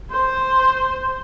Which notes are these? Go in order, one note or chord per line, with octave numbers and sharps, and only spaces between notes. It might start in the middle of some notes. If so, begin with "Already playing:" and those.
C5